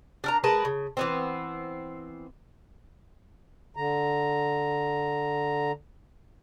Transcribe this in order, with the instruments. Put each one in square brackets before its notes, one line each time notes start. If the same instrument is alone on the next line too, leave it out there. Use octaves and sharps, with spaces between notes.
[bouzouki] D4 A#4 A#5
G#3 A#4 B4 A5
C#3
E3 B3 C4
[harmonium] D3 A#5